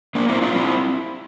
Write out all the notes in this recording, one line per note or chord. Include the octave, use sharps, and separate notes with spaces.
A#3 D4
C4 E4
D4 F4
C4 E4